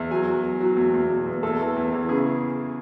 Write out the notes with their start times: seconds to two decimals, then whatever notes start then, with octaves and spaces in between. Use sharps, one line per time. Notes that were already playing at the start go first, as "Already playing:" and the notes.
Already playing: E2
0.11 F#3 G#5
0.27 F#3
0.44 F#3
0.60 F#3
0.77 E2
0.94 E2
1.10 B2
1.26 E2
1.43 E2 A4
1.60 E3
1.76 E2
1.92 E3
2.09 C#3 G#4